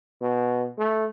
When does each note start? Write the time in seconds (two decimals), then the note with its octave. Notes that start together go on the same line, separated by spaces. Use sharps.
0.21 B2
0.78 A3